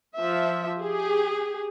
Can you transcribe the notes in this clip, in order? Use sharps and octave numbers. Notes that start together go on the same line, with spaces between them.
F3 E5
G4 G#4